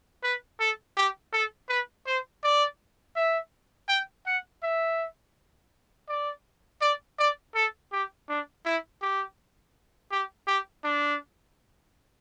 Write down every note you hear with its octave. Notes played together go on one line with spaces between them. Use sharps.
B4
A4
G4
A4
B4
C5
D5
E5
G5
F#5
E5
D5
D5
D5
A4
G4
D4
E4
G4
G4
G4
D4